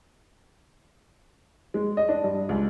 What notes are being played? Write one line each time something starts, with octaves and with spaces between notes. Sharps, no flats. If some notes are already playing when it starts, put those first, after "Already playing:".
G#3
D#5
D4
G2
C#2